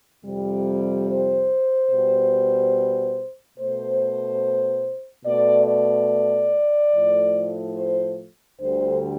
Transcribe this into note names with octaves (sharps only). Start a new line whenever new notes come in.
F2 C3 G3
C5
B2 G3
B2 A3 C5
B2 A3 D5
D5
A2 F3 A3
C5
D2 D3 G3 C5